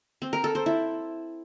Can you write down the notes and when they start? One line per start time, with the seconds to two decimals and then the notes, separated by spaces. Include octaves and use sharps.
0.22 C4
0.33 A#4
0.44 A4
0.55 C5
0.66 E4